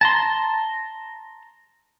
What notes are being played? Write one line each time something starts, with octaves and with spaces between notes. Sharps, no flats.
A5 A#5 C6